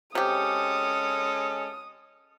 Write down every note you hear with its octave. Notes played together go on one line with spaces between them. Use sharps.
C3 G#3 C#4 G4 A4 D#6